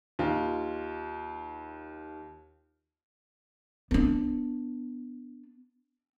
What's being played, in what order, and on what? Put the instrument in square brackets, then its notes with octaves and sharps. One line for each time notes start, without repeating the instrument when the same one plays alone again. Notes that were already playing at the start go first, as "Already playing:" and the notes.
[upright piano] D#2 F4
[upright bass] B3 D4